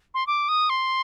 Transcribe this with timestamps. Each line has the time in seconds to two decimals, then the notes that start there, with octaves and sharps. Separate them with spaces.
0.14 C6
0.27 D6
0.48 D#6
0.70 C6